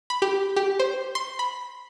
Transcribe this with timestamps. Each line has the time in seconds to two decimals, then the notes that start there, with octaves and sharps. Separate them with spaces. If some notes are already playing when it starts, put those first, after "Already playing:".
0.10 B5
0.22 G4
0.56 G4
0.80 C5
1.15 C6
1.39 B5